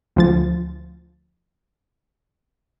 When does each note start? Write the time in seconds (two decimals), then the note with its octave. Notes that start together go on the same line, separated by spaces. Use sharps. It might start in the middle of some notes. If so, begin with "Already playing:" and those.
0.16 D2 F3 A6